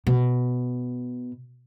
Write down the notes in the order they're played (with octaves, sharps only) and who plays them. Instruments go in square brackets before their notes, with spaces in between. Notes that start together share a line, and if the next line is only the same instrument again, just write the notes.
[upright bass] B2